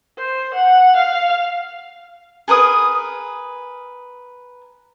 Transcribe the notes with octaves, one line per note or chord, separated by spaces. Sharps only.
C5
F#5
F5
G#4 A#4 B4 D#6